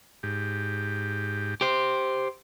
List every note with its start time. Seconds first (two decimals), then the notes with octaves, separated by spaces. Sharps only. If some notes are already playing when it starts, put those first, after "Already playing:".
0.23 G#2 G4
1.61 G4 C5